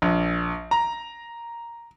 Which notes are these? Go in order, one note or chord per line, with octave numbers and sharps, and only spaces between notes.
A#1
A#5